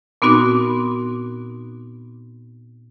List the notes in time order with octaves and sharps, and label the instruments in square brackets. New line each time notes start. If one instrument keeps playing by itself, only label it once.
[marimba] A#2 B3 C4 D#4 F#4 D6